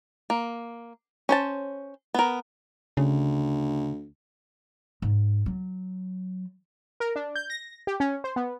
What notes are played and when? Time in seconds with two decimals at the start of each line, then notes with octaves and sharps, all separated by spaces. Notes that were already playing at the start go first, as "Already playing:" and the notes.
0.30 A#3
1.29 C#4 C5 A5
2.14 B3 A#4
2.97 D2 C#3
5.02 G#2
5.46 F#3
7.00 A#4
7.16 D4
7.36 G6
7.50 A#6
7.87 G4
8.00 C#4
8.24 C5
8.36 B3